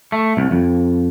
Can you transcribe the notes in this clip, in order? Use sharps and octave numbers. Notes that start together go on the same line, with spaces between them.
A3
C2
F2